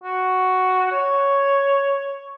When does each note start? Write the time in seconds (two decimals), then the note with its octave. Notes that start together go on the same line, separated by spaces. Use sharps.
0.04 F#4
0.92 C#5